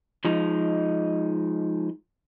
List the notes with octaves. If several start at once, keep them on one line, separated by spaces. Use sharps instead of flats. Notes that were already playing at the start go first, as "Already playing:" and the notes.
F3 G#3 D#4